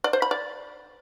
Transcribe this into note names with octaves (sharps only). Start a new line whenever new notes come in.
D5
C5
B5
D5